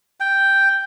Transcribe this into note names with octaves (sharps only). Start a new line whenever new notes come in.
G5